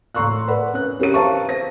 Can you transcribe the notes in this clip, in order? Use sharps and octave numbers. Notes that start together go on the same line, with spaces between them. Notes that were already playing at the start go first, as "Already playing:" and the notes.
A2 A#5 C6 C#6 E6 F#6
A#4 B4 D5 F#5 B5
C#4 F#6
C#4 G4 A#4 C#5 D#7
B4 C5 F5 A5 A#5 C#6
C5 A#6